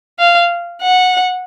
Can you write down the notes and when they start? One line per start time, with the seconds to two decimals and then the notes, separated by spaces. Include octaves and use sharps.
0.19 F5
0.82 F#5